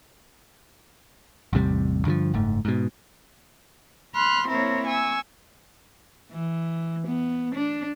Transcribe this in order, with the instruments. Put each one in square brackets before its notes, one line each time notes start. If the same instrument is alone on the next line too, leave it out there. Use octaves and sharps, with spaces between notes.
[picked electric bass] A1 E2 C3 G3
G2 D3 E3 F3
F#1 G#2 A3
G#2 B2
[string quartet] B5 C6 F6 F#6
A#3 C4 E4 A#4 C5 C#5
G#5 C#6 E6
[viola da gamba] E3
B3
D4